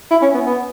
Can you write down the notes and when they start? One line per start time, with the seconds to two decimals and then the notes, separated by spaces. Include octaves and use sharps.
0.11 E4
0.22 C#4
0.34 B3
0.46 B3